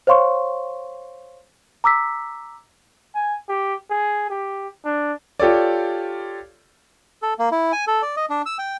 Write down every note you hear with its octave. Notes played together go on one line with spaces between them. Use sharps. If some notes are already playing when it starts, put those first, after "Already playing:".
C5 C#5 F5 C6 C#6
A#5 D6 E6 B6
G#5
G4
G#4
G4
D4
F4 G4 A4 C#5 D5
A4
A#3
E4
G#5
A4
D5
D#5
D4
E6
G5